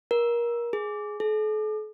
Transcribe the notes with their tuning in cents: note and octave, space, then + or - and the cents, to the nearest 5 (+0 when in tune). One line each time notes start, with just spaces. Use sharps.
A#4 +25
G#4 +10
A4 -45